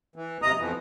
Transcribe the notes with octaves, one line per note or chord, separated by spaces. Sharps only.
E3
D#2 C3 D#5 A#5 D#6
F2 B2 E3